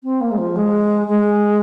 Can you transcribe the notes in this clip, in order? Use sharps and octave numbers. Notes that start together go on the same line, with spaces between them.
C4
A#3
G#3
F3
G#3
G#3